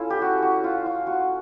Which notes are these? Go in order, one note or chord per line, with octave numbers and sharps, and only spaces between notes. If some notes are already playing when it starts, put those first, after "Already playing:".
Already playing: C#4 E4 F4 A4
G4
F#4
F#4
F4
F4
F#4